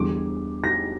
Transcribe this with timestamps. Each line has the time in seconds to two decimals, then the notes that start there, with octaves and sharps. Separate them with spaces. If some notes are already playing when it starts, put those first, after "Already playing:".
Already playing: E2 D3 G3 D6
0.64 A#6